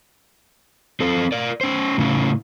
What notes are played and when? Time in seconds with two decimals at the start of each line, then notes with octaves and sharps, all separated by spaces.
1.00 C4 A4 C5
1.32 A#4 D5
1.61 C#4 C5
1.98 A2 C#3 C#4 E4